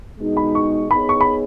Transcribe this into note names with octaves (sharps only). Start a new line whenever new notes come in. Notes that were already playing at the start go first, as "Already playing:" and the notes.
B2 G#3 D#4
B5
C#6
B3 D#4 G#4 C#5 B5
C#6
B5